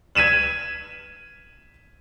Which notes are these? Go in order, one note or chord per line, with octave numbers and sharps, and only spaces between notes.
G#6 B6 D#7 E7 F#7